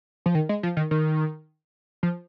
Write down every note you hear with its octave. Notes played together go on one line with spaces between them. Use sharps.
F3
D#3
G#3
F3
D#3
D#3
F3